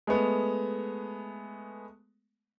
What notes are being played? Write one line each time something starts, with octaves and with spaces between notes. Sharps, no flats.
G#3 A3 B3